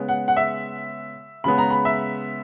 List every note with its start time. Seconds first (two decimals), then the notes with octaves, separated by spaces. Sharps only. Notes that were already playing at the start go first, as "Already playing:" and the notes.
Already playing: C#3 G#3 B3
0.09 F#5
0.28 F#5
0.37 E5
1.44 C#3 G#3 B3 B5
1.58 A#5
1.70 B5
1.85 E5